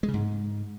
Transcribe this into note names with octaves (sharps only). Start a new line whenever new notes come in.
G#3
C#3
G#2